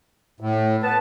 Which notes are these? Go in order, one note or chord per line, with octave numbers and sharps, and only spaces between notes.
A2
B3 B4 A5